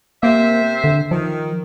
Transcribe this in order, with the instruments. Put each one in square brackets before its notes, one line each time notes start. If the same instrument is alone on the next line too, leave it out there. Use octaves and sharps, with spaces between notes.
[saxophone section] C3 C5 E5 [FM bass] A#3
[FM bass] D3
[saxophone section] D#3 [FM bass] F3